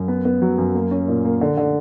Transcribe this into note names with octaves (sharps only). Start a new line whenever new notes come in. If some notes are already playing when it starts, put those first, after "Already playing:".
Already playing: F#2
B3
B3
F#3
F#2
A#3
C#4
A#2
A#3
D3
D3